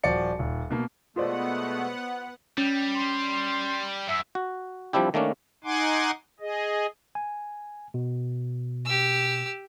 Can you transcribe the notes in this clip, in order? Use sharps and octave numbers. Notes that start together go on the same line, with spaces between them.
D#1 F3 F#4 D5 C#7
D#1
B2 A#3
B2 G#3 A3 B3 F4 C5 D5 F#5
G3 C#4
C6
F#2 E5
F#4
F3 G3 C4 D4 E4 G4
D#3 A3 A#3 C#4 D4
D#4 F#5 G#5 C6 D6
G#4 D#5
G#5
B2
G4 E6